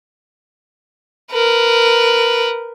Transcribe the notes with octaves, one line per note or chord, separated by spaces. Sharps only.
A#4 B4